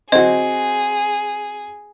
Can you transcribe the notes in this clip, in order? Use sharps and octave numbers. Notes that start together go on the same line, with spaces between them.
C4 F#4 G#4 D#5